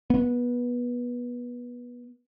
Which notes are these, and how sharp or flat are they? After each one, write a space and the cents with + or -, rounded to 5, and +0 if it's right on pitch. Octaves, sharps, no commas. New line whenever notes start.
B3 -20